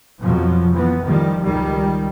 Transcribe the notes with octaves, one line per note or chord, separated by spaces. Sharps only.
F2 B2 F3 F#3
E3 F3 B3
D#3 F3 G3
C#2 D#3 G3